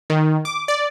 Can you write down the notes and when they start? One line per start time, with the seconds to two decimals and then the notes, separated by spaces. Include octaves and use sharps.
0.10 D#3
0.45 D6
0.68 D5